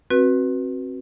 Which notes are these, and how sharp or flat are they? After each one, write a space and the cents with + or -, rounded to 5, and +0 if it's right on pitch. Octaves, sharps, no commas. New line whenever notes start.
C4 +25 F#4 +0 B4 -10